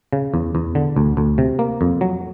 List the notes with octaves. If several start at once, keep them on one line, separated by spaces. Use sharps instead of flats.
C#3
E2
E2
D3
D2
D2
C3
A#3
F2
F#3